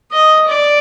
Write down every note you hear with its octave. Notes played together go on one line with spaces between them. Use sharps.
D#5
D5